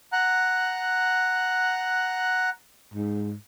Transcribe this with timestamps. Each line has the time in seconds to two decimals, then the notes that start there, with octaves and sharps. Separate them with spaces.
0.13 F#5 A#5 F#6
2.94 G#2